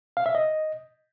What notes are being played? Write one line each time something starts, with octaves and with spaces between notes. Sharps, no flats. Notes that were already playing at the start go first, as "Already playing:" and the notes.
F5
E5
D#5